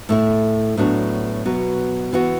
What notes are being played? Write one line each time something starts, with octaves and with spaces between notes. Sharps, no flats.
A2 A3 E4
A2 F#3 B3 D4 F#4
B2 F#3 B3 F#4
E3 B3 F#4